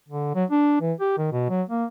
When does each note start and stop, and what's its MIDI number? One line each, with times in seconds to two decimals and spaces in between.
0.08 0.33 50
0.35 0.45 54
0.51 0.76 62
0.81 0.93 52
1.00 1.16 67
1.18 1.28 51
1.33 1.50 47
1.50 1.62 54
1.69 1.85 58